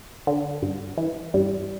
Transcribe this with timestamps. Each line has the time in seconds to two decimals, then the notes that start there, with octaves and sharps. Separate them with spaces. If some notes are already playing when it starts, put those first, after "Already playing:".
0.27 D3
0.62 G2
0.98 E3
1.34 G2 G3